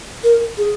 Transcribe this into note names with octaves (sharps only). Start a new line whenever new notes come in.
A#4
G#4